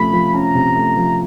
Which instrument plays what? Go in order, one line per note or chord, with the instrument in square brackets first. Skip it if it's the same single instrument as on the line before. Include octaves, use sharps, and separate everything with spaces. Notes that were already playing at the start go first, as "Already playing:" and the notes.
Already playing: [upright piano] C3 F3 A3 C#4 [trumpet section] B5
[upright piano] F3
[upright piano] C#4 [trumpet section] A#5
[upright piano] C3
A3
F3